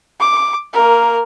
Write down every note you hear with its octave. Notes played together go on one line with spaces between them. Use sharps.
D6
A#3 A#4